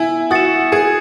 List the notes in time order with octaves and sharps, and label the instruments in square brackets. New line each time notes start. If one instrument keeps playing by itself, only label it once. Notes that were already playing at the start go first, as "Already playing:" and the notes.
Already playing: [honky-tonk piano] E4 [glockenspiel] G#5
[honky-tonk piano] F#4 [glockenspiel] D#6 A6 C#7 E7
[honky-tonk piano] G#4 [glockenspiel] G#5